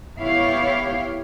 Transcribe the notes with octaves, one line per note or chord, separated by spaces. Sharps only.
B3 E4 G4 C#5 F5